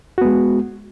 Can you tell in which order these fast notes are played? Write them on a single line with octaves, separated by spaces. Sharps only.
F#4 B3 G#3